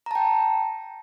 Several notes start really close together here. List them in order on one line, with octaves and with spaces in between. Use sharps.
A#5 A5 G5